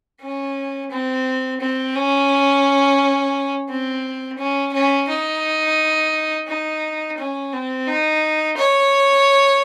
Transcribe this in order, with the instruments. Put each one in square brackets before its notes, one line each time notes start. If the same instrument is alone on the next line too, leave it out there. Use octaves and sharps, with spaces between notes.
[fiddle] C#4
C4
C4
C#4
C4
C#4
C#4
D#4
D#4
C#4
C4
D#4
C#5